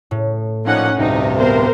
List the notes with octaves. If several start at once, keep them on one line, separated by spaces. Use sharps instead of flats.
A2
A#2 F3 A#3 C#4 D#4 F#5
D2 G2 C3 D#4
B3 A#4 C5